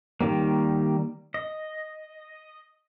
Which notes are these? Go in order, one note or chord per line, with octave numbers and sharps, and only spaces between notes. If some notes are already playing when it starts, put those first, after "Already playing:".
D#3 G3 A#3
D#5